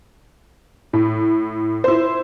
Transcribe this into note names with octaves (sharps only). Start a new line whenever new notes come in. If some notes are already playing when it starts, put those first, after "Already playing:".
A2
E4 C5